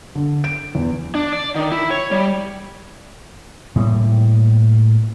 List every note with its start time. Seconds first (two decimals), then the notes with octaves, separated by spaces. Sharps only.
0.15 D3
0.44 D7
0.75 E2
1.15 D4
1.33 D5
1.56 D#3
1.72 E4
1.91 C#5
2.11 G3
3.76 A2 G3 A#3